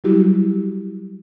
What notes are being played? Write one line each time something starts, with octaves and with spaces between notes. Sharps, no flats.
F#3 G3 E4 F#4 G4